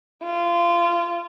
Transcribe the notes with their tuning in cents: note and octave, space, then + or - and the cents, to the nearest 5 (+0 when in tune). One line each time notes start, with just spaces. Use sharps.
F4 -25